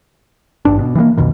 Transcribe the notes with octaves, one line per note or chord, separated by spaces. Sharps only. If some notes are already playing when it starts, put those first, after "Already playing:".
G#1 G2 D4
B2
E3 G3 A#3
B1 F2 B2 D#3